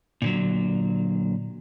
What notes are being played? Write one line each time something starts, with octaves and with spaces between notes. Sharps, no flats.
A#2 D3 F#3